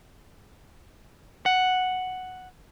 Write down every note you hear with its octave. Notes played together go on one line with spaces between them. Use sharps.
F#5